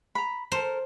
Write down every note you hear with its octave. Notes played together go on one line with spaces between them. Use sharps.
A#5 B5
A4 A#4 C5